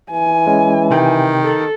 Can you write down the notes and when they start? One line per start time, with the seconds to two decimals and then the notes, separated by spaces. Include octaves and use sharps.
0.11 E3 G#5
0.47 G#3 C#4
0.90 C3 D#3 G5
1.44 A4